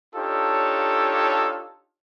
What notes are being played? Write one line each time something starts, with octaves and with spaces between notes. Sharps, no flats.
D4 D#4 F4 G4 A4 C#5